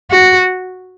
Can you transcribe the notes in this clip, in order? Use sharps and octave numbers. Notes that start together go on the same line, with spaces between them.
F#4